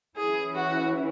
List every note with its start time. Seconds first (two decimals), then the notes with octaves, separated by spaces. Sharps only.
0.17 E3 C#4 E4 G#4
0.55 F#4